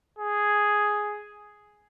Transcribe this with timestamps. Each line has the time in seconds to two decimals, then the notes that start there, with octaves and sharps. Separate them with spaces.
0.18 G#4